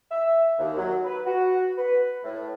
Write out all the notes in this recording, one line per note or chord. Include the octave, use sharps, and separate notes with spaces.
E5
D#2
F#3
B4
F#4
B4
A2